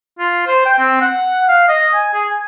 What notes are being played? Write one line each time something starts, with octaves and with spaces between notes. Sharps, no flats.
F4
C5
G5
C4
F#5
F5
D#5
G#5
G#4
G#5